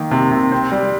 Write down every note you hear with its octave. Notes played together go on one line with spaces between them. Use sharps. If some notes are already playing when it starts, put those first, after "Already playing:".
Already playing: D#3 A#3
C3
C3
C4
G3